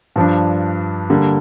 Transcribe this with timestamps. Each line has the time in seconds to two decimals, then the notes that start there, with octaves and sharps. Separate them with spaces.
0.16 G2 F3 D4
1.10 D3 G3 A#3